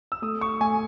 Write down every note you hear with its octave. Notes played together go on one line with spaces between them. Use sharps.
E6
A3 D#6
C#6
A3 G#5